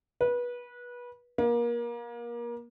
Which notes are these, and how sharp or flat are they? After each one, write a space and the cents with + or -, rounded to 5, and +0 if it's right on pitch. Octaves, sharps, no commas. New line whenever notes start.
B4 -25
A#3 +30